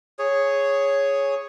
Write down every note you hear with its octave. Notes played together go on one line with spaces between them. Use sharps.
G#4 C#5